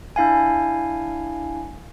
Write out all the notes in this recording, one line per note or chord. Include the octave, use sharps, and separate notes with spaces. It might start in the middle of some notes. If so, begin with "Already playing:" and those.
D4 E4 F5 G#5